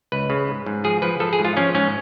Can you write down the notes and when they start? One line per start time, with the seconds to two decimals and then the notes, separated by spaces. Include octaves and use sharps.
0.12 C#2 B4
0.30 C#3
0.48 G#2
0.66 G#2
0.84 F3 G#4
1.02 F3 B4
1.20 F3 A4
1.33 G#4
1.39 G#2
1.45 F4
1.57 F3 C#4
1.74 G#2 C#4